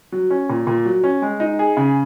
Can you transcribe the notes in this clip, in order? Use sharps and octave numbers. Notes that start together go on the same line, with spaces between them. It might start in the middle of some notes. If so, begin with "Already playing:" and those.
F#3
C#4
A#2
A#2
F#3
C#4
G#3
D#4
G#4
C#3